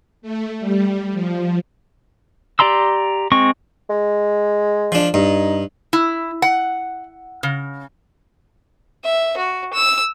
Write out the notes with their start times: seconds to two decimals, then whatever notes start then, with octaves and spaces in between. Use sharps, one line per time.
0.22 A3
0.60 G3
1.12 F3
2.59 G4 D5 A#5 C6 E6
3.32 G#3 C4 C#6
3.89 G#3
4.92 F3 D4
5.14 G2 D#4
5.93 E4
6.42 F#5
7.43 C#3
9.04 E5
9.37 F#4
9.73 E6